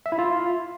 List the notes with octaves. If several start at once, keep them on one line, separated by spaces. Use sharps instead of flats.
E5
E4
F4